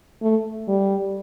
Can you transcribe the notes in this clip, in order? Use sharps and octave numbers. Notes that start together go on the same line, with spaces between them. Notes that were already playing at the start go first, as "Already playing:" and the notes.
A3
G3